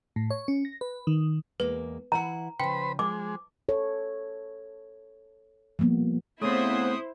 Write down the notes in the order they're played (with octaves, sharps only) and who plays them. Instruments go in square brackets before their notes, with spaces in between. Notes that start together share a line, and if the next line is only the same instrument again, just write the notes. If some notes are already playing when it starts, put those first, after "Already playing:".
[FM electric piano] A2
C#5
C#4
A#6
B4
D#3
[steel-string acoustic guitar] E2 G#3 A#3 [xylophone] B4
[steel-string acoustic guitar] E3 E4 F#5 [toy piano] A#5
[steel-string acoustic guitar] C#3 F3 [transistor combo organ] B4 C5 B5 [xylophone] G5
[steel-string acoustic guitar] F3 [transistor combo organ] G#3 [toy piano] D6
[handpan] A4 C#5
F3 G3 A#3 B3
[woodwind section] C#3 B3 [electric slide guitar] A3 C4 [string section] E4 C5 [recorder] D#6